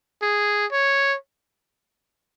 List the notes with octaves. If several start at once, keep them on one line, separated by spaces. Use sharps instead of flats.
G#4
C#5